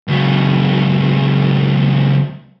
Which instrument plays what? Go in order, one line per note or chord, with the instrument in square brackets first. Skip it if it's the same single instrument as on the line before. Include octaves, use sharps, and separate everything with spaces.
[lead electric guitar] C#2 F#3